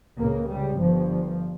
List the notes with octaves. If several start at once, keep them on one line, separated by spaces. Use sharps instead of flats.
C#2 C#3 A#3
G3
G1 G2 F3